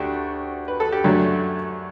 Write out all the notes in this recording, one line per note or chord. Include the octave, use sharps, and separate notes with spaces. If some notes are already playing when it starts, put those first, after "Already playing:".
Already playing: D2 A3 D4 F#4 G4
B4
A4
G4
F#2 D3 F#3 A3